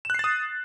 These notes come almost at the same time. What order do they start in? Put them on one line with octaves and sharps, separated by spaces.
E7 F#6 C7 A6 D#6